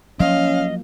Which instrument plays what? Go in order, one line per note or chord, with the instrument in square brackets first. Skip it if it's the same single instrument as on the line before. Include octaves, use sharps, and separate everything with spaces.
[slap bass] F3 F#3 A#3 [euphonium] C#4 [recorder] D#5 [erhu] F5